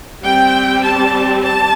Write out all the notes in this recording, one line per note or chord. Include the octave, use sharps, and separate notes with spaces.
G3 C4 G5
A5
A5